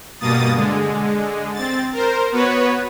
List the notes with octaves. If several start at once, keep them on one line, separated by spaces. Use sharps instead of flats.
G2 B2 A#3 D#6 A6
D3 G#3
C4 A6
A#4 C5
B3 F#4 B4 C#5